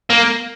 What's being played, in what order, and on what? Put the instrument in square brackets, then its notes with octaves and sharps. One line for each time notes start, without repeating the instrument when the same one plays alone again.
[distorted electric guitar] A#3